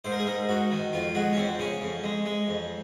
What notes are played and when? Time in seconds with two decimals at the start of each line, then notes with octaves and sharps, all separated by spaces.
0.04 G#2 C5
0.12 A#4
0.19 G#4
0.26 G#2 A#4
0.49 G#2 F#4
0.71 D#3
0.93 F2 F4
1.15 G#3 F#4
1.33 C#4
1.37 F2 C4
1.59 C#3 C#4
1.81 F2
2.04 G#3
2.26 G#3
2.48 F2